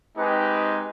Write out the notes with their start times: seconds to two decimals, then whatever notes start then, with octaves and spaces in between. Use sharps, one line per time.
0.15 G#3 C4 D#4 G4 B4